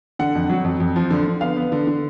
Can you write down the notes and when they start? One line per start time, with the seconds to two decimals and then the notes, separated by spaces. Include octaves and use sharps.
0.19 D3 F#5
0.35 F2
0.49 F#3
0.64 F2
0.80 F2
0.96 F3
1.10 D3
1.26 D3
1.41 B3 F5
1.56 B3
1.72 D3
1.87 D3